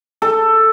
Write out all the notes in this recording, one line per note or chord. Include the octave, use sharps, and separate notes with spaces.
A4